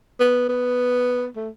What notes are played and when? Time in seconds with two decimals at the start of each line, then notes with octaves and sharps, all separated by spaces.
0.20 B3
0.49 B3
1.36 A3